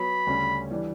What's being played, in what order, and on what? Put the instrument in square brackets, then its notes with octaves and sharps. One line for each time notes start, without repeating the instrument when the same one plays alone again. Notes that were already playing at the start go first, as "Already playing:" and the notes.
Already playing: [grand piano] F#3 B3 F#4 C#5 [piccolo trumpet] B5
[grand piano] D2 C#3 G3 C#4
E3 G3 D4